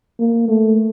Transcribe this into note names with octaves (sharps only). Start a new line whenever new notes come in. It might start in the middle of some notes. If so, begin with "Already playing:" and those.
A#3
A3